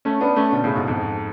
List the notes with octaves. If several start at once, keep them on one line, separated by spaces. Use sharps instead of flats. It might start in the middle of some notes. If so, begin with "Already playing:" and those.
A3 C#4
B3 D4
A3 C#4
B2 D3
A2 C#3
G#2 B2
F2 G#2